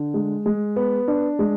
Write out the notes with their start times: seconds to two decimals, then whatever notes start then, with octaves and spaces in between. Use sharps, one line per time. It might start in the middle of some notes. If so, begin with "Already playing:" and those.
Already playing: D3
0.14 G#3
0.46 G#3
0.76 B3
1.08 D4
1.39 G#3